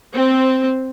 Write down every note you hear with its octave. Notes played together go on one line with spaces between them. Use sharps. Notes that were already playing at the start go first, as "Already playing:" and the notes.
C4